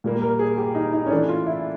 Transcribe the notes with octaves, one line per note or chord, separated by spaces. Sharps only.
A#2 G3 A#3
A#4
G#4
G4
D#4
D#4
C#4
A2 E3 A3 D4
F4
E4